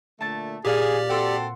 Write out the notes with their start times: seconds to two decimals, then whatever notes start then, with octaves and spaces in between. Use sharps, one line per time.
0.21 A#2 D3 A3 A5 A6
0.65 A#2 G4 G#4 D5 F5
1.09 C4 F#4 A4 F#5 C6 E6